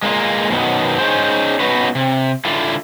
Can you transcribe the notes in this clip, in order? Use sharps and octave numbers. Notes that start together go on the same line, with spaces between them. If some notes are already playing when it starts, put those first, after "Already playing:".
G#3 A#3 D4 F4
F#2 B2 D#3 F#3 B3 D#4
C#4 D#4 G#4 C5
B3 C#4 D#4 F#4 B4 C#5
C3
D3 E4 F4